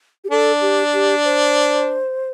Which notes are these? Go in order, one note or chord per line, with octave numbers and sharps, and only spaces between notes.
G4
D4 A4
G4
G4
C5